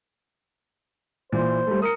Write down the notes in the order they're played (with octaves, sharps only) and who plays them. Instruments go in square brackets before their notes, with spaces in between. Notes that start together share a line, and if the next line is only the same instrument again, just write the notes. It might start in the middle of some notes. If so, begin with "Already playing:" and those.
[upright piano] A#2 E3 [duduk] C5
[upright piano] G3 A3
[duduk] A#4 [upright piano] D#6 C#7